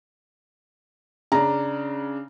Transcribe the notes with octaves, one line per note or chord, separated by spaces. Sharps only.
C#3 D4 A#5